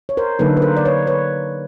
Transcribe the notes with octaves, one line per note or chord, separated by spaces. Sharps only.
C#5
A#4 C5
D3 F#3 A#3 D#4 A4 B4
B4
A#4 C5
D5
B4 C#5
B4 C#5